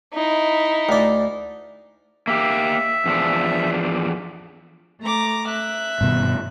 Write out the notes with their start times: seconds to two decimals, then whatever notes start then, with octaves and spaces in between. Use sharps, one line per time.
0.14 D#4 E4
0.89 D2 D5
2.27 A#3 G4 E5
3.06 E2 F3 D4
5.01 A3 A#5 D6
5.47 E5 F#6
6.01 G2 B2 D#3